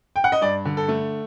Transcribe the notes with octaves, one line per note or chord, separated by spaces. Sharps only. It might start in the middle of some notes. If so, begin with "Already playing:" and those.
G5
F#5
D#5
G2 D5
D3
A4
A3